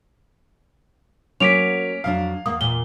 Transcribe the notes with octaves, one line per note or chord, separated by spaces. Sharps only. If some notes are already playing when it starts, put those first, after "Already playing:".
F#3 A#3 C#4 A#4 D6 B6 D7 F7
F2 F#3 D4 F5
E2 A#3 D#6
A#2 G7